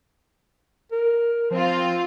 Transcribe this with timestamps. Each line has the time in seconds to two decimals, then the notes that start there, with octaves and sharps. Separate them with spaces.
0.92 A#4
1.51 F3 C4 F4